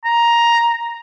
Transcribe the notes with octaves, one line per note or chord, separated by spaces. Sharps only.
A#5